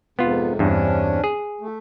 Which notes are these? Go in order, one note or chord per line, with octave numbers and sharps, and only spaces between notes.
F2 G#2 C3 B3 F4
E2 G2 C3 C#4 D4
G#4
A3